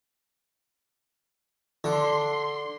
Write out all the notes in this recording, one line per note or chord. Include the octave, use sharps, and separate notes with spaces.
D3 C6